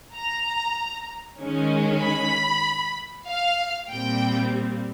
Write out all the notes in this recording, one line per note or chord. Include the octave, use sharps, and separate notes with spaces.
A#5
D#3 G#3 C#4
B5
F5
A#2 G3 C4 G5